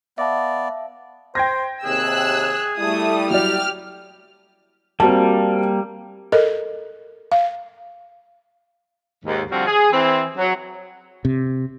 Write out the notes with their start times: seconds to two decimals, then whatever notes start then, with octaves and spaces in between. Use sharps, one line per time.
0.18 B3 D5 E5 F5 A5
1.35 C5 G5 G#6 A#6
1.84 D#2 C3 G#4 E6 F#6
2.78 G3 A3 E4 D#6
3.31 F#3 G4 D5 F6
5.00 G3 A#3 C4 F#4 A5
6.32 A4 A#4 D#5
7.32 F5
9.25 D#2 G#2
9.51 D3 F3 G3 C4 F4 F#4
9.67 G#4
9.92 E3 C4
10.38 F#3
11.25 C3